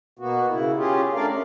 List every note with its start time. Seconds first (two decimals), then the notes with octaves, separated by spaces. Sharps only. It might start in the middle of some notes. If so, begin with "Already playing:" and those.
0.19 B2 A#3 B3 F#4
0.49 C#3 E4
0.76 C#4 F4 G4 G#4
1.14 A3 D4 A#4 D5 F5
1.29 C#4